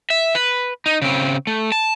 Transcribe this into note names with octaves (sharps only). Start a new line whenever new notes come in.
E5
B4
D#4
C#3 C4
A3
A5